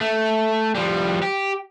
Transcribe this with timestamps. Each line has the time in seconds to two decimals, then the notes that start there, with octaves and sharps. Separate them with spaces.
0.01 A3
0.75 F3 G3
1.23 G4